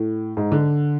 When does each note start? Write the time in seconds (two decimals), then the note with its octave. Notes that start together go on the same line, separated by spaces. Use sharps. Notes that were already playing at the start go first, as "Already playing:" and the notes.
Already playing: A2
0.37 G#2
0.52 D3